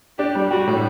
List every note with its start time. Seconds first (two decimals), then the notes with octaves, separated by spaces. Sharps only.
0.18 D4 G4
0.35 G3
0.51 F#4 G4
0.67 A2